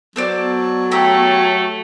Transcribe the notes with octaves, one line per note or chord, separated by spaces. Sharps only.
F#3 B3 A4 C5 D5
A3 G4 A4 A#5